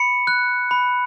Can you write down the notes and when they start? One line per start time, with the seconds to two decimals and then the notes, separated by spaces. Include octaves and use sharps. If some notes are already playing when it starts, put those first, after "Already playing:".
Already playing: B5 C#7
0.27 F#6
0.71 B5